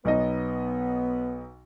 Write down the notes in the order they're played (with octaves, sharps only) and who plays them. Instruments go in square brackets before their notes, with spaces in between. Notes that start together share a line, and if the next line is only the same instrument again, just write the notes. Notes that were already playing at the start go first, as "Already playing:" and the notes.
[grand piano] B1 D#4 D#5 [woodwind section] B3